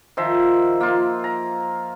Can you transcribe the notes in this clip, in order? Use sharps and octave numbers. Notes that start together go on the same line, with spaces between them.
D#3 F3 C5 E5
A#3 F4
A#5